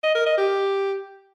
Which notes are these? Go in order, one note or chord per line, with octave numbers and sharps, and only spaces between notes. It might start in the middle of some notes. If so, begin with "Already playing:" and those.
D#5
A#4
D#5
G4